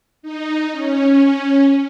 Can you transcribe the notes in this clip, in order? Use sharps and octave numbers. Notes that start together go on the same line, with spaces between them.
D#4
C#4